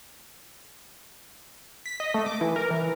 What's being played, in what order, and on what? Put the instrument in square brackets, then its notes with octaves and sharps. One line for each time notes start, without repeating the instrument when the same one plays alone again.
[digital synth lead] B6
D#5
A3
D6
E3
A#4
E3